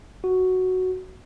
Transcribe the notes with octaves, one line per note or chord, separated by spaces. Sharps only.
F#4